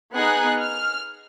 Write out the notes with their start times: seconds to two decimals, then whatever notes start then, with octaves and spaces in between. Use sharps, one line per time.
0.13 B3 D#4 G#4 F#6
0.61 F6